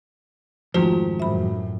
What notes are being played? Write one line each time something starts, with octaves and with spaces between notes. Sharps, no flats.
F2 G#2 D#3 F3 A3 F4 F#4 C5
F#2 A2 E5 B5